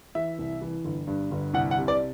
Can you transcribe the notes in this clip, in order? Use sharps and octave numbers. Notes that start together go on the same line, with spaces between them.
E3 E5
C2
E3
G1
G2
G1
C2 F#5
F#5
C3
D5